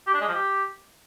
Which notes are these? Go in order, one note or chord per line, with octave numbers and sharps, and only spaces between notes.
G4
D4
G#3
F3
G4